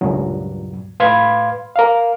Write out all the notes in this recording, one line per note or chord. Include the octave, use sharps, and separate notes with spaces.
C#2 G2 A#2 F#3
A2 B4 F5 B5 C6 G#6
A#4 F5